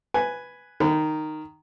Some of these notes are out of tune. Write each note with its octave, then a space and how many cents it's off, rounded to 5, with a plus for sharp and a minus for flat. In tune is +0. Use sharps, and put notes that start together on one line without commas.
B4 +0 G#5 +0
D#3 -5 B5 +40